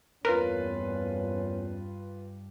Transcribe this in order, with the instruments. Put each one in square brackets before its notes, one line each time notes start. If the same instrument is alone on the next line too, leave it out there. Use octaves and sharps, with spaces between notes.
[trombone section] E2 A#2 C#4 [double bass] G2 [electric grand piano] F4 B4 [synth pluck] A#4